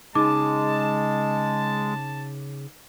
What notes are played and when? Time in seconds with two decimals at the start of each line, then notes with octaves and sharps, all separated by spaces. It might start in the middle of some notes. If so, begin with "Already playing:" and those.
0.15 C#3 G#3 D#4 A5 D6